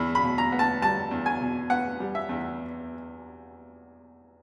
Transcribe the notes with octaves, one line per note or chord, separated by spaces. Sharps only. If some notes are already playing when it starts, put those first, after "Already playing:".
Already playing: E2 B5
B5
B2
A#5
B3
A5
G3 A5
E2
G#5
B2
B3 F#5
G3
E5
E2